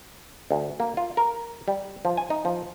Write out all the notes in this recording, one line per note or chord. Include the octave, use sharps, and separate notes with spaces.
D2
A#3
F4
A#4
G3
F3
G#5
D#4
F3